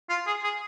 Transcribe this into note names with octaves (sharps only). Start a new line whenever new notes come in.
F4
G#4
G#4